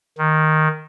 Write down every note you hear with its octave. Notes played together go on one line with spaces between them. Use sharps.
D#3